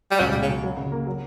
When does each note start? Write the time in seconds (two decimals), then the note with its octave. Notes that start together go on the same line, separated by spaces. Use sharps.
0.11 G3
0.20 C#2 F#3
0.31 G3
0.34 B2
0.42 C#3
0.49 F#3
0.64 F#3
0.77 C#3
0.92 A#3
1.07 F#3